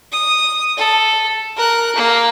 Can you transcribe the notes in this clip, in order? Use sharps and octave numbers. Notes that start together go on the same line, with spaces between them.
D#6
A4
A#4 F#6
A#3